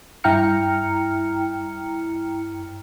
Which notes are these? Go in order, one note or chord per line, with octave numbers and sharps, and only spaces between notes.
G2 E4 G5 A#5 F6 C#7